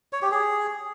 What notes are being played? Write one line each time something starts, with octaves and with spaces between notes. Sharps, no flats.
C#5
G4
G#4